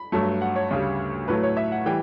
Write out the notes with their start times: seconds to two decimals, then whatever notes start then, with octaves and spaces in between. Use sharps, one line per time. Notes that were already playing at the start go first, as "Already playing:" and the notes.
Already playing: B5
0.12 G2 F#3 A3
0.42 F#5
0.56 C#5
0.71 D2 C#3 G3
1.28 A2 F#3 A3 B4
1.43 C#5
1.57 E5
1.72 F#5
1.86 E3 G3 G5